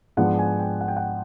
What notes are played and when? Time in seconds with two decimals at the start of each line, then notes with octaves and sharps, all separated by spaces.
0.17 G#2 F3 G#3 B3 D4 F#5
0.39 G#5
0.60 G5
0.81 F#5
0.88 G5
0.97 F#5